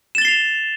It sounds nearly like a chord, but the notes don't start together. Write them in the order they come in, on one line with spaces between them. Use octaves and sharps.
E7 A6 G7 C7 F7